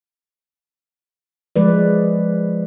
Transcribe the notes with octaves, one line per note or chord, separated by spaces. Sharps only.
F3 G#3 B4 D5